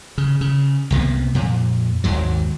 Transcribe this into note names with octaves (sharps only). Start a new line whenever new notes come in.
C#3
C#3
C2 C3 A#3 B3
F2 A#2
G#1 D#2 G#2 F#3